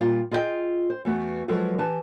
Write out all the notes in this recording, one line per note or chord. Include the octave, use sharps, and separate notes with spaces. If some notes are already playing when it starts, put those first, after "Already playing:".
A#2 G3 F4
F4 G#4 D#5 E5 G5
C5
E2 A3 B3 F#4
F3 F#3 G#3 A4 B4
E3 G4 B4 A5